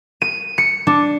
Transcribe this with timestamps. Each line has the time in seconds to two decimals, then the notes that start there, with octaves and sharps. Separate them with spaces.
0.22 D#7
0.58 C#7
0.87 D4